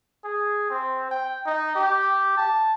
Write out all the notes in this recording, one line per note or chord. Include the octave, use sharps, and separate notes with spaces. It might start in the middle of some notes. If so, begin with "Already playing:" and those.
G#4
C4
G5
D#4
G4
A5